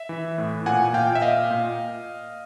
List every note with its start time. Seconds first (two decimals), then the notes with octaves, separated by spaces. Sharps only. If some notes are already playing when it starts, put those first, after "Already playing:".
Already playing: E5
0.09 E3
0.38 A2
0.66 A#2 F#5 G#5
0.93 A#2 F5 G5
1.15 E5
1.22 A#2 D#5 F5
1.51 A#2